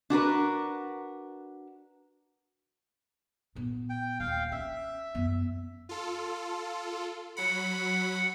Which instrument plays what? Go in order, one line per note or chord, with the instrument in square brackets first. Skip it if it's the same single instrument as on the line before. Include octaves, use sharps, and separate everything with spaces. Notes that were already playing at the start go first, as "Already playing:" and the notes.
[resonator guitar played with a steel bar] D4 F#4 A#4 B4
[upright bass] A#2 B3
[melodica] G5
[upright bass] D#1 [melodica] F5 G5
[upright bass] C#4 [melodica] E5
[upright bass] F#2 B3
[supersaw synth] F4 A4
[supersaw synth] F#3 B5 [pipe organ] F#5